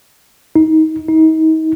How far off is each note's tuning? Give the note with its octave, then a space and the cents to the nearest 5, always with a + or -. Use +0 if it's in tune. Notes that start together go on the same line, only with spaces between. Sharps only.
D#4 +25
D#4 +35